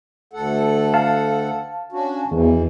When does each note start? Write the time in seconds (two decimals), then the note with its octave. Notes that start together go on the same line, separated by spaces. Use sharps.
0.33 D2 A4 F#5
0.94 F5 A5
1.92 C#4 D4 F#4
2.31 E2 B2 E3